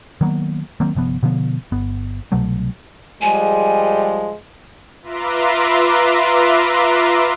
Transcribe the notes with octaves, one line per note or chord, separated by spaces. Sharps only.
D#3 F#3 A#3 B3
D#3 F#3 A#3 C4
G1 C3 F3 B3
B2 D3 F3 B3
G1 B3
C2 B2 F#3 A3
F3 G3 G#3 G#5
F4 B4 E5 A#5 C6 D6